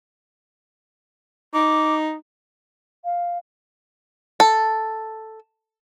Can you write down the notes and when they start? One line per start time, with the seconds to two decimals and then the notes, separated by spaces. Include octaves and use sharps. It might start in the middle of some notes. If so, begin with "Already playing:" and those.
1.54 D#4 D6
3.05 F5
4.40 A4